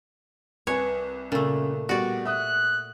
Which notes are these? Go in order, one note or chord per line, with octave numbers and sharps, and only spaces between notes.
C2 B4 C#5 G#5
A#2 C#3 A3
B2 G3 F#4 D5 C#6
E5 D#6 F#6